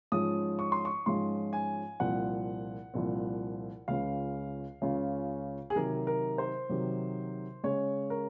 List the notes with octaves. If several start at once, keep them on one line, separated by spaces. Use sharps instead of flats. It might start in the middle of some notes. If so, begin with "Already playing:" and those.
G#2 F3 G#3 C#4 F4 D#6
C#6
C6
C#6
G#2 F3 G#3 C#4 F4 C6
G#5
C2 A#2 F3 C4 F#5
C2 A#2 F3 C4
C#2 C#3 G#3 C#4 F4 F5
C#2 C#3 G#3 C#4 F4
G#4
C3 D#3 F#3 A#4
A#4
C5
C3 D#3 F#3
C#3 G#3 C#4 C#5
A#4